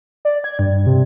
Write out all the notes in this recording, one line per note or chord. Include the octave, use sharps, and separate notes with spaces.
D5
G#6
G2
C3